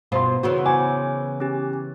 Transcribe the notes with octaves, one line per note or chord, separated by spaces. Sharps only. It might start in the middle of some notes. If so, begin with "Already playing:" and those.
G2 B2 F4 C5 C6
C#3 E3 B3 F#4
C5 G#5 D6
C#4 G4